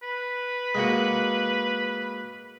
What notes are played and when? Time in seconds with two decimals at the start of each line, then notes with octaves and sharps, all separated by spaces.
0.02 B4
0.75 G#3 A#3 F#4